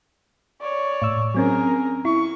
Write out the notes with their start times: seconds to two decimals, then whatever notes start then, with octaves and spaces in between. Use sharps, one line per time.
0.61 C#5 D5
1.02 A2 E6
1.35 F#3 C4 C#4 G#4 A#4
2.05 E4 C#6